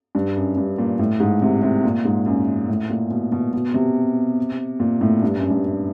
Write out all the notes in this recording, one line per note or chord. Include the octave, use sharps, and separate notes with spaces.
G2
F#2
G2
A#2
A2
G#2
C3
C3
A#2
G#2
F#2
A2
A#2
B2
B2
B2
C3
A#2
A2
G2
F#2
G2